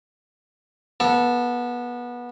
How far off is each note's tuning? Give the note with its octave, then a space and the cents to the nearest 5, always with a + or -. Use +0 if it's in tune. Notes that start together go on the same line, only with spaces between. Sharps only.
B3 -25 A4 +0